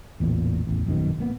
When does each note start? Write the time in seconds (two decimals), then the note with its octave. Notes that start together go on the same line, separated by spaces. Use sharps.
0.20 A1 E2 A#2
0.67 A1 E2
0.86 A#1 F#2 B2 D#3
1.19 A1 A#3 B3